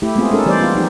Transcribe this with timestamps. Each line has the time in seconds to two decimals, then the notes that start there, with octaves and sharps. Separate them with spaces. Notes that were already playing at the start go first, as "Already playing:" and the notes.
0.02 A3 E4 G4
0.15 G#3 A3 B3 C4 F4 G#4
0.31 G#3 C#4 D#4 A4 A#4
0.46 E3 G3 G4 C5 D5
0.61 B3 F4
0.75 F3 D#4 G4